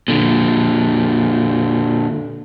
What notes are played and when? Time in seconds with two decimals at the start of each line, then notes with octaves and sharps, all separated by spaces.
0.08 A#2 D3